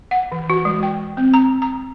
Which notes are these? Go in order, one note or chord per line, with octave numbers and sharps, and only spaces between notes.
F#5
E3
F#4
G#3
G5
C4
A#5
A#5